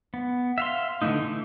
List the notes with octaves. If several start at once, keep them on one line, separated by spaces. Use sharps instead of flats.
B3
E5 F5 C6
D3 E3 A3 B3 D#4
E3